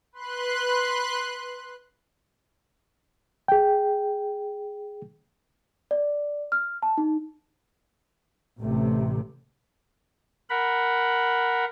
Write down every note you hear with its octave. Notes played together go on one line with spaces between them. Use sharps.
B4 C6 F#6
G#4 G5
D5
F6
A5
D#4
A1 C3 A3
A#4 F#5 B5